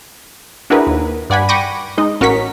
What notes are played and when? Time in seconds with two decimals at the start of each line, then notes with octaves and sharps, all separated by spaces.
0.70 D4 E4 F#4 G#4 A#4 B4
0.87 D#2
1.30 G2 D5 F#5 G#5 B5
1.49 G5 B5 C#6 D6 A#6 D#7
1.98 G#3 D#4 D#5
2.20 A1 C#4 F#4 A#4 C#6 B6